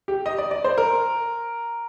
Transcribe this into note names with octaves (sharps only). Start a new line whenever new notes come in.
G4
D#5
D5
D5
C5
A#4